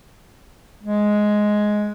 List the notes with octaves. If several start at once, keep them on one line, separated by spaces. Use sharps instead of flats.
G#3